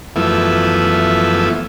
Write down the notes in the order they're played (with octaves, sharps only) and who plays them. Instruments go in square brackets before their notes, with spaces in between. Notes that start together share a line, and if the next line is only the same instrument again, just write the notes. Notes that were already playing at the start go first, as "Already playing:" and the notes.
[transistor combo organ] F#2 E3 F3 A3 B3 E4